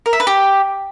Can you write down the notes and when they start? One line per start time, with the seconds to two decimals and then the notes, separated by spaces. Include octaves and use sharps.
0.06 A#4
0.13 E5
0.20 B4
0.27 G4